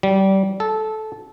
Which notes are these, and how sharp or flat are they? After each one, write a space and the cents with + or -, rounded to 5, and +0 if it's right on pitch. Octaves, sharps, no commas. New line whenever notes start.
G3 -25
A4 -15